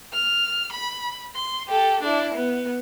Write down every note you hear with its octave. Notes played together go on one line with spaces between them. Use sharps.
F6
B5
C6
G4 A4
D4 E4
B3